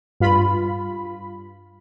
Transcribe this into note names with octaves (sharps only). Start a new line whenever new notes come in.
G2 F4 B5